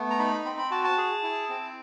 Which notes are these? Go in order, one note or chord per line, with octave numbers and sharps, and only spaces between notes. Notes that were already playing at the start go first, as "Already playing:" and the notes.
Already playing: A3 B3
A#5
D#4 B5
C4 B5
B5
F#4 A5
A5
G#4
E4
C4